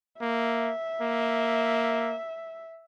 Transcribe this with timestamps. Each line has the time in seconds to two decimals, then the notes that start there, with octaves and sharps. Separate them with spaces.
0.21 A#3 E5
1.02 A#3